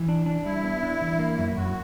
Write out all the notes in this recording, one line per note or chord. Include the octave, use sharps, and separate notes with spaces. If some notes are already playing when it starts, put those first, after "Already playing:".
Already playing: E3
D4
D4
G3 E4
B3
D4
E3
A#3
F#2
F#2 F#4